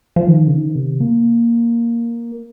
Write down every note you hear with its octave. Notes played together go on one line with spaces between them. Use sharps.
F3
D#3
C#3
D#3
C3
A#3